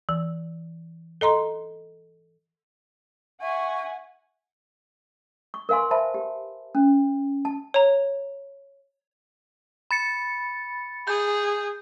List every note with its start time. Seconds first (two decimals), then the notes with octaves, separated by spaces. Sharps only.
0.09 E3
1.21 A4 D#5 A#5 C6
3.42 E5 F#5 G#5 C#6
5.54 C#6
5.69 A#4 B4 F5 G#5 C6
5.91 C5 E5 A5 B5
6.14 G4
6.75 C#4
7.45 A5
7.74 C#5 A#5
9.91 B5 A6 C#7
11.07 G#4 G6